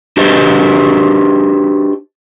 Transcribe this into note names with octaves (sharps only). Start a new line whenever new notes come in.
D4 F#4 G4 B4 C5 D#5